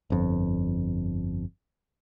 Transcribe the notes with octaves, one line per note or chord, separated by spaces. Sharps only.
G1 F2